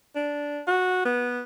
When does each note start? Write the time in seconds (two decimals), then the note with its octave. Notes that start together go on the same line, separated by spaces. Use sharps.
0.16 D4
0.67 F#4
1.05 B3